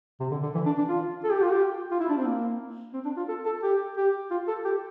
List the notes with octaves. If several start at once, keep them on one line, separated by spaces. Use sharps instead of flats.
C3
D3
D3
E3
D4
D4
F4
A4
G4
F4
G4
F4
E4
D4
C4
A#3
C4
D4
F4
A4
A4
G4
G4
F4
A4
G4